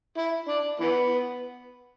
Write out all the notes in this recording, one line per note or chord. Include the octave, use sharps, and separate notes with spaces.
E4
D4
E3 B3